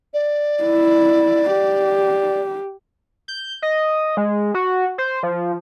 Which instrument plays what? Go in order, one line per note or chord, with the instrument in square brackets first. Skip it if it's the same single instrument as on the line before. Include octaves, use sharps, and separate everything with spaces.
[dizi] D5
[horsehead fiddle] E4
G4
[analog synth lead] G6
D#5
G#3
F#4
C5
F3